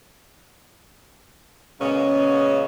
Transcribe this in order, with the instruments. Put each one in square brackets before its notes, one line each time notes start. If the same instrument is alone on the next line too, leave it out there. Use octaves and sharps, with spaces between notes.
[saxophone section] A#2 C#3 F#3 G#3 B3 C#4